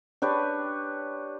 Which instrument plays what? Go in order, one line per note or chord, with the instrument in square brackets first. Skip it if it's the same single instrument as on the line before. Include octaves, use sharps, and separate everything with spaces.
[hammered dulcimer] D4 G4 B4 C#5